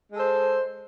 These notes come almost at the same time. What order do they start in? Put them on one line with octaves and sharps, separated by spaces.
G#3 A4 C5